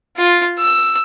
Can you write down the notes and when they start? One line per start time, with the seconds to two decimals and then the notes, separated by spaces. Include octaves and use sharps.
0.17 F4
0.58 E6